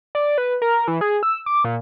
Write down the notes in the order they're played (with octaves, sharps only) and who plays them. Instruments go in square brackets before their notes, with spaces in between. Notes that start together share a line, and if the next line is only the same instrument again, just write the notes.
[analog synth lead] D5
B4
A#4
E3
G#4
E6
D6
A#2